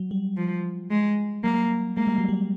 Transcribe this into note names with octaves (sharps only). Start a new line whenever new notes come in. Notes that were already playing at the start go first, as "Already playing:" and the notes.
Already playing: F#3
G3
F3
G#3
F#3 A#3
G#3 A#3
G3
F#3
G3